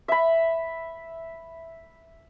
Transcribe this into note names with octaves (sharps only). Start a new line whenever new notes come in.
E5 B5